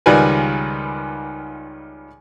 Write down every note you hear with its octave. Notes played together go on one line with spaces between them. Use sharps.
C#2 D#3 G3 F4 B4 G#5